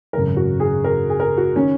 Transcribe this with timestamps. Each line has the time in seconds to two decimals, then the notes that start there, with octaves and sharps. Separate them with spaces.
0.13 G#1 F#2 C#3 A#4
0.36 F#4
0.60 G#4
0.84 A#4
1.10 G#4
1.20 A#4
1.37 F#4
1.56 D#3 C#4